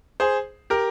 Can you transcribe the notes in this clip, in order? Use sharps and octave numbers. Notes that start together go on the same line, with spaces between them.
G#4 C5
G4 A#4